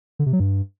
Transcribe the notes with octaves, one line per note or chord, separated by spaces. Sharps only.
D3
C3
F#3
G2